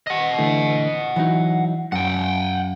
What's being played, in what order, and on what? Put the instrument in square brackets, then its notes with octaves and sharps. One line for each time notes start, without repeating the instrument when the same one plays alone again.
[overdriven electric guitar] D#5 F#5
[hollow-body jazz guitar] D3 E3 A3
E3 F#3 D#4
[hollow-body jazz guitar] F#2 [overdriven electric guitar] F#5 G5